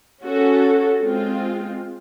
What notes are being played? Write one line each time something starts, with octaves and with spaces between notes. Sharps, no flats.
C#4 F#4 A4
G#3 C4 F4